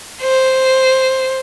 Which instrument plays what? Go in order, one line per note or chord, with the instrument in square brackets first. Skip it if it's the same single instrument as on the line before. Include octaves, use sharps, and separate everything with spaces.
[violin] C5